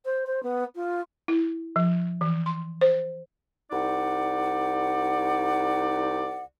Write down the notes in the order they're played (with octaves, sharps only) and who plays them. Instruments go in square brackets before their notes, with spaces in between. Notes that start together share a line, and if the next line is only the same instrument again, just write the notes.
[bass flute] C5
C5
B3
F4
[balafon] E4
F3
E3
C6
C5
[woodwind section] C2 D#4 D5 F#5